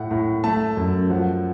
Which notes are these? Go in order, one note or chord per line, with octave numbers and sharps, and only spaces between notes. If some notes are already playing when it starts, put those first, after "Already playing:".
Already playing: A2 F#5
A2
A3 A5
F#2
F3 F#5